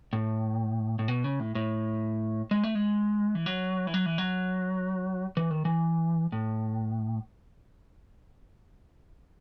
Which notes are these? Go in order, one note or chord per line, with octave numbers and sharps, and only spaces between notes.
A2
A2
B2
C#3
A2
A2
G#3
A3
G#3
E3
F#3
E3
F#3
E3
F#3
E3
D#3
E3
A2